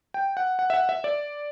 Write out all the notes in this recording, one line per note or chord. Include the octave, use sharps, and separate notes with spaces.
G5
F#5
F#5
E5
F#5
E5
D5